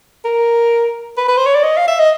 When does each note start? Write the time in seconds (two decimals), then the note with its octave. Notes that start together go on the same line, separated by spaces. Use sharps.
0.24 A#4
1.17 B4
1.28 B4
1.37 C5
1.46 C#5
1.55 D5
1.63 D#5
1.77 F5
1.88 E5
1.99 D#5